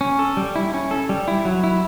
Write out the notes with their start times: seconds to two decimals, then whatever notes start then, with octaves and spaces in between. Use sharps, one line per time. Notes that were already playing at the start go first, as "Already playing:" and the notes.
0.01 C#4
0.19 A4
0.37 G3
0.56 E4
0.74 C#4
0.91 A4
1.09 G3
1.28 E4
1.45 F#3
1.64 E4